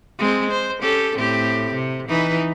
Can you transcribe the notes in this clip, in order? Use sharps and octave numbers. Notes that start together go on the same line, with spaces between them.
G#3 C4
C5
C#4 G4 A4
A2 C4 G4
C3
E3 D#4 B4